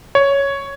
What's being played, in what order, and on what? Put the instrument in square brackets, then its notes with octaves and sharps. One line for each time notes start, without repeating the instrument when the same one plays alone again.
[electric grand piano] C#5